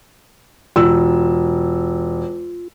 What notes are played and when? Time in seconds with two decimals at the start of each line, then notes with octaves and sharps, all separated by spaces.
0.76 E1 F4 E6